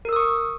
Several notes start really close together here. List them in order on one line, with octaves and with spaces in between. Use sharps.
A#4 E6 D#6 C#6